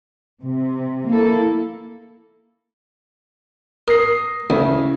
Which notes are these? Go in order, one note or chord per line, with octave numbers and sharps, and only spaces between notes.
C3
A#3 E4 A4
A#4 D#6 A#6 C7
D2 C#3 E4